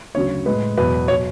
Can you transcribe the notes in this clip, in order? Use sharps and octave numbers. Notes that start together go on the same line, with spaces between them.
D2 C#3 F#3 C#5
A2 G#3 B4
E2 B2 F#3 B4
B2 F#3 C#5